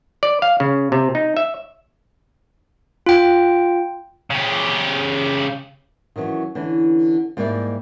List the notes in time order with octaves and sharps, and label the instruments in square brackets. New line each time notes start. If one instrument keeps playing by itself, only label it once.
[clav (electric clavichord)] D5
F5
C#3
C3
D#4
E5
[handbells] F4 G5
[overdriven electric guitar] C#3 G4
[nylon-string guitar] D#3 E3 F#3 C#4
D3 E3 C#4
G#2 G3 A#3 E4 D5 E5